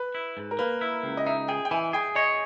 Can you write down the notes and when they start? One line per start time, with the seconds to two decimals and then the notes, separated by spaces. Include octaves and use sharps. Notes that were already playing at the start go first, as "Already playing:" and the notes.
Already playing: B4
0.15 E4
0.37 G#2
0.51 A#4
0.59 A#3 B4
0.81 E4
1.03 C#2
1.17 D#5
1.26 D#4 E5
1.48 G#4 G5
1.65 G5
1.71 E3 G#5
1.93 G#4 G5
2.15 C#5 D#5